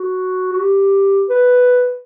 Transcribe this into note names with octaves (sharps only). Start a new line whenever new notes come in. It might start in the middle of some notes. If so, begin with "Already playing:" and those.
Already playing: F#4
F#4
G4
B4